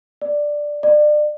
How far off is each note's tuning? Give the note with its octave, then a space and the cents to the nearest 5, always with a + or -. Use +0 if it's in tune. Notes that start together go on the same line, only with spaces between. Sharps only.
D5 +5
D5 +30